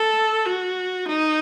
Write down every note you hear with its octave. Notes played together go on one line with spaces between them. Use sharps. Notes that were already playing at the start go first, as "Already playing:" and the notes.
Already playing: A4
F#4
D#4